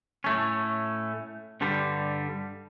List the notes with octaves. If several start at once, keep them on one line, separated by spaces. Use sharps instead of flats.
A2 A3 C#4
G2 D3 G3